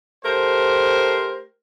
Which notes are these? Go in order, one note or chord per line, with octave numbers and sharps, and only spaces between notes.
A3 G4 A#4 C5